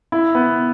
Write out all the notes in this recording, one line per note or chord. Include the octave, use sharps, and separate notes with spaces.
E4
B3